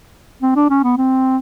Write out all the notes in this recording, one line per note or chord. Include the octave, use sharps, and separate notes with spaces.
C4
D4
C#4
B3
C4